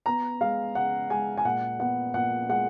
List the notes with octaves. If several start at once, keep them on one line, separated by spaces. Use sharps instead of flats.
B3 A#5
G#3 F5
C#3 F#5
G#3 G#5
G#5
A#2 F#5
B3 F#5
A#2 F#5
G#3 F#5